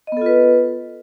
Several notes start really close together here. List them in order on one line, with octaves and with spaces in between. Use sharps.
D#5 B3 A4 F4 B4